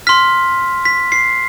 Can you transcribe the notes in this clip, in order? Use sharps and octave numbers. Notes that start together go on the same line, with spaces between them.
C6 F6 B6
B6
C7